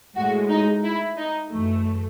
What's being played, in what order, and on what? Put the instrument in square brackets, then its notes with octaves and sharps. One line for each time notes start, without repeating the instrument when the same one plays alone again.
[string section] A2 G#3 F#4
D#4
E4
D#4
F#2 E3 A3